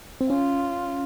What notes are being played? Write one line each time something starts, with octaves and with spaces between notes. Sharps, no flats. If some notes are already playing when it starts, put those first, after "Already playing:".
C4
C#4 F4